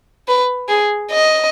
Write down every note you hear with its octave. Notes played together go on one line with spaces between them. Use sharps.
B4
G#4
D#5